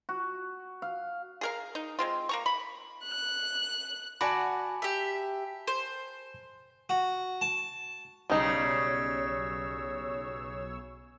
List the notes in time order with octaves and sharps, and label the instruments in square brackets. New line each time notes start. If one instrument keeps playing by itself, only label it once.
[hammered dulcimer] F#4
F5
[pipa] G#4 A#4 F5
D#4
G#3 C4 F4
A#3 A#5 C#6
B5
[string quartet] F#6
[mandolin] F#4 D5 [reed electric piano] G#5 A5 B5
[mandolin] G4 E5
C5
[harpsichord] F#4
A5
[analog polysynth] B1 C#5 E6 [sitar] C#3 [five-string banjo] G3 D#4